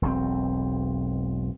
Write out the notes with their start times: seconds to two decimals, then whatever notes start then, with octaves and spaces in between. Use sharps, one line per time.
0.02 E1 B1 B2 C4